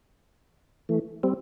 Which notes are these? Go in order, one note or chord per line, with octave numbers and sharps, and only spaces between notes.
E3 A3
G3 C4